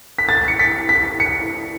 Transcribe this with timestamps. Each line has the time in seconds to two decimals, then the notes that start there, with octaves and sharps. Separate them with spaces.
0.19 B6
0.29 A6
0.48 C#7
0.59 B6
0.89 B6
1.20 C#7